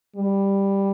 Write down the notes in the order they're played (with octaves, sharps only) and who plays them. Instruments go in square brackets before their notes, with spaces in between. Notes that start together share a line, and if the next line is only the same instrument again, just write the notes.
[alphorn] G3